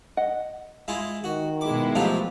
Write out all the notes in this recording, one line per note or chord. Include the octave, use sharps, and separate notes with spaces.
D#5 F#5
G#3 E4 F4
D#3 F#4
B2 G#3 E4 D6
F3 F#3 A3 F4 G4